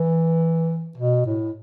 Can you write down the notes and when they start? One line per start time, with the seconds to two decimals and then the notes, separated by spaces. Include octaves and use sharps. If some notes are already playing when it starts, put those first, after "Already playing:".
Already playing: E3
0.98 B2
1.26 A2